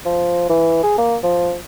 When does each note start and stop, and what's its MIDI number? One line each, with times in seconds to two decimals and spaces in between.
0.05 0.49 53
0.50 0.78 52
0.83 0.94 68
0.98 1.16 58
1.23 1.55 53